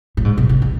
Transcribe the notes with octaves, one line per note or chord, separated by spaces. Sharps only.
A2
G#2
B2
C#3
E3